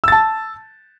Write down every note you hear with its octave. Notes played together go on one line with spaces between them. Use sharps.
A5 E6 A6